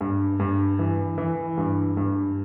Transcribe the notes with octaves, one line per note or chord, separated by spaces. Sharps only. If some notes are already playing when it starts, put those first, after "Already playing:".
G2
G2
E3
E3
G2
G2